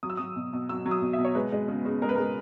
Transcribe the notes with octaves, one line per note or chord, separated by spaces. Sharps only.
F#3 D#6
E6
F#3 D#6
B2
B2
F#3 E6
F#3
D#6
B2
B2 E5
C#5
G#3 B4
G#3
C#3
C#3
G#3 A#4
B4
G#3 A#4